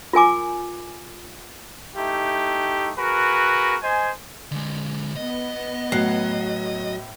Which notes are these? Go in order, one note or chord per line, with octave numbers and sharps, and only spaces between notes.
F4 A#4 G#5 D6
A3 D#4 E4 G4
F#4 G#4 A#4 B4
C5 D#5 G#5
D3 G#3
B3 D#5
A2 F#3 F#6 C7